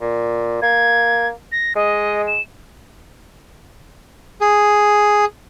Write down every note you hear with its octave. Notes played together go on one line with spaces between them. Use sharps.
A#2
A#3 G#6
A#6
G#3 D#5
E7
G#4